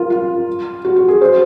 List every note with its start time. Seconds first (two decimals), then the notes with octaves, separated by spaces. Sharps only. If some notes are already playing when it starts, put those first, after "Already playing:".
Already playing: F4 A#4
0.10 F4
0.85 F#4
0.96 F#4
1.08 G#4
1.21 C5